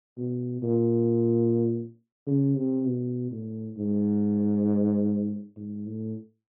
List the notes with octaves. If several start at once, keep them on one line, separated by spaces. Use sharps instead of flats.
B2
A#2
C#3
C3
B2
A2
G#2
G#2
A2